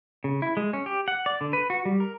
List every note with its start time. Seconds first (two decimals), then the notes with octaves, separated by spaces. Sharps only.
0.24 C#3
0.42 E4
0.57 G#3
0.73 C#4
0.86 G4
1.08 F#5
1.26 D5
1.41 D3
1.53 B4
1.70 F#4
1.85 G3
2.00 A#4